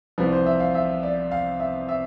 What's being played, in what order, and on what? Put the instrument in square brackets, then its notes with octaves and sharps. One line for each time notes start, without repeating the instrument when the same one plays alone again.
[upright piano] C2 C3 F3 B4
C5
E5
F5
E5
D5
F5
E5
E5